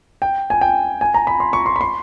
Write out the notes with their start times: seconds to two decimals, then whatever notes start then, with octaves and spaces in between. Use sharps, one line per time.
0.22 G5
0.50 G#5
0.61 G5
1.01 G#5
1.14 A#5
1.27 B5
1.40 C6
1.53 C#6
1.66 C6
1.76 B5
1.81 C6